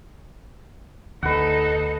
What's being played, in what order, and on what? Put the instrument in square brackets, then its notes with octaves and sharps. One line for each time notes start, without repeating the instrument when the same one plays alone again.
[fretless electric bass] D2 [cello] D#4 A4 [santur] B4 F#5